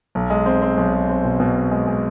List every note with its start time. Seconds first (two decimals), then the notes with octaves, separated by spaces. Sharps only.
0.15 B1
0.30 G#3
0.46 C4
0.62 C4
0.77 B1
0.93 G#3
1.09 C4
1.25 B2
1.40 B2
1.55 C4
1.71 G#3
1.87 G#3